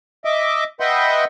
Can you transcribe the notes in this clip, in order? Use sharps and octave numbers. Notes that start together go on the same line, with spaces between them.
D#5 E5 D6
B4 D#5 E5 F#5 G5 C6